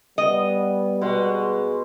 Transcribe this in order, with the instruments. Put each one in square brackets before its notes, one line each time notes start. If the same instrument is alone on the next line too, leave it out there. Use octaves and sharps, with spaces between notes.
[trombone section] G3 B3 [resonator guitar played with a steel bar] D#5
[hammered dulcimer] B2 C6 [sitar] G#3 F#4